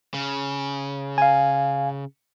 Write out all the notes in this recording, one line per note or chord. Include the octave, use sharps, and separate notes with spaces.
C#3
F5 G#5